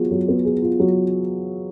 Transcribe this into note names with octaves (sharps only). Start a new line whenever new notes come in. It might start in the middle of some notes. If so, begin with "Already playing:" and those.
Already playing: F#3 B3 F4 G#4
F#3
B3
G#4
F4
F#3